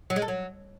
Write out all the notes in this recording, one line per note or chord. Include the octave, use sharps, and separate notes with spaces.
F#3
G#3
A4
F#3